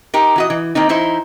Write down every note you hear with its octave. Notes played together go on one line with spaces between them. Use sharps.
D#4 G4 A#4
E3 F#4 D#5
E3
D#3 A#3 C4 D#4
E3 D#4 E4 C5